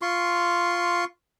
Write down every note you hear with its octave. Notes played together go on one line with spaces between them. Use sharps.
F4 C6 C#6